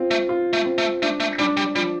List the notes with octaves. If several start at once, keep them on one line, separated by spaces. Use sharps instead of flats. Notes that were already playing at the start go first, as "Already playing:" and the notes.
Already playing: C4 F4
A3
F4
A3
C4
A3
A3 D4
A3
G3 D4
G3
F3 G3